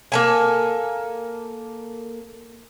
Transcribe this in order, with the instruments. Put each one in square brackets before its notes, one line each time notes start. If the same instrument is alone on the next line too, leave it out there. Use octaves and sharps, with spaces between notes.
[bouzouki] A#3 A4 G#5